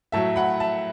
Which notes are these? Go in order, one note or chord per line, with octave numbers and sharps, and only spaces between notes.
A2 F#3 A3 E5 A5
F#5 B5
E5 A5